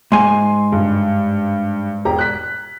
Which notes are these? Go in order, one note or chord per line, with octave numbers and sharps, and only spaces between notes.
G#2 G#5 C6
G2
E1 G4 A#5
F#6 B6